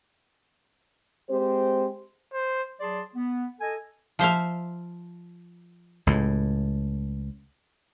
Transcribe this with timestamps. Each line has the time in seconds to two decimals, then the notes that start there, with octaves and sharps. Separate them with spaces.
1.29 G#3 C4 G4 C5
2.34 C5
2.80 F#3 G#4 D5 A5 C6
3.15 B3
3.61 A4 D#5 G#5
4.19 F3 C5 E5 F5
6.07 C#2 A2